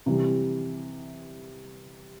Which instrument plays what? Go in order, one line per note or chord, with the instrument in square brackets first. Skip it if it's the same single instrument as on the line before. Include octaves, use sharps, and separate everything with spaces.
[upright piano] C3 E3 G3